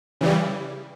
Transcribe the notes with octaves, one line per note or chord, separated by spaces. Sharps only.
C#3 E3 G3